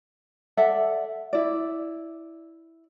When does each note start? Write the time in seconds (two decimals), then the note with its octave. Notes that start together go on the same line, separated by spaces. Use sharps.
0.57 A4 D5 E5 F#5
1.33 E4 D5